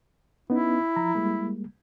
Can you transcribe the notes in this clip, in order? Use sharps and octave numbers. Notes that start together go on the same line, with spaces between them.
B3 C#4 D#4 E4
F3 A#5
G3 G#3 A#3